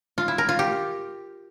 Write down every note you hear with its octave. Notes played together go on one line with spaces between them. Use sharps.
F4
E4
A#4
F4
G4